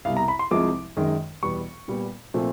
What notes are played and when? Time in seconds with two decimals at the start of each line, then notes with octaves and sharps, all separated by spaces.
0.05 C2 B2 G3 F5
0.17 A#5
0.28 B5
0.39 C6
0.51 C2 C3 F3 G#3 D6
0.97 F#2 D#3 G#3
1.43 E2 B2 G3 B3 C#6
1.88 A#2 G3 B3
2.34 A#2 F3 A3 C4